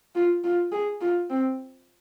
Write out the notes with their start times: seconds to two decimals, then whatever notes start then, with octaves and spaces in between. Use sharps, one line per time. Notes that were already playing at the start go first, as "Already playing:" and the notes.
0.15 F4
0.44 F4
0.72 G#4
1.01 F4
1.30 C4